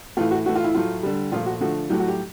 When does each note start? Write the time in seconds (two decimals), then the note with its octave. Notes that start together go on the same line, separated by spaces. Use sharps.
0.17 A2 E3 A3 F4
0.31 F#4
0.46 A2 E3 A3 F#4
0.55 F4
0.64 E4
0.74 A2 F#3 A3 F4
1.03 D3 G3
1.32 A#2 F3 A3 F4
1.46 F#4
1.61 D3 F3 A3 F#4
1.90 A2 F#3 A3 G4
1.99 F#4
2.08 G4